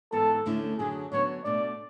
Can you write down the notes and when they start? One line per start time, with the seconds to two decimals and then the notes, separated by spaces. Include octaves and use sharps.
0.12 G#2 E3 B3 A4
0.46 D2 D3 A3 C#4 E4
0.78 F#2 D3 F#3 G#4
1.12 D3 F#3 B3 D4 C#5
1.44 B2 A3 D4 D5